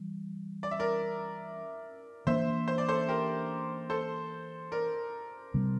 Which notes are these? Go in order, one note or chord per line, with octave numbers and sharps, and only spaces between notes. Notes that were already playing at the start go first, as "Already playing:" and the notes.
Already playing: E3 G3
D5
E5
A#4 D5
E3 A#3 D4 C5 E5
C5
D5
A4 C5
G4 A#4
A4 C5
A#4 D5
C3 G3 C4